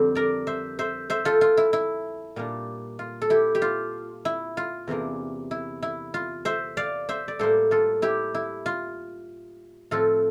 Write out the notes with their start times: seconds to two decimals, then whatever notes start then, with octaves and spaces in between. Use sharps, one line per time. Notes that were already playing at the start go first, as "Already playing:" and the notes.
Already playing: F2 D3 G3 C4
0.15 A#4 D5
0.47 C5 E5
0.79 C5 E5
1.10 C5 E5
1.25 F4 A4
1.41 F4
1.57 E4
1.73 E4
2.36 A#2 G3 A#3 D4
2.99 F4
3.22 A4
3.30 E4 G4
3.55 G4
3.62 F4
4.25 E4
4.57 F4
4.87 E2 C3 E3 A#3 D4
5.51 E4
5.82 E4
6.14 F4
6.45 C5 E5
6.77 D5 F5
7.09 C5 E5
7.28 D5
7.39 A2 G3 A#3 A4 C5
7.71 F4 A4
8.02 E4 G4
8.34 E4
8.66 F4
9.91 A2 F3 C4 F4 A4